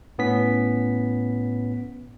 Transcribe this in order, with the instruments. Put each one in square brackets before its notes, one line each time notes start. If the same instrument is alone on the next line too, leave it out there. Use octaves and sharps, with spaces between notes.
[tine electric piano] A2 B3 C#4 B6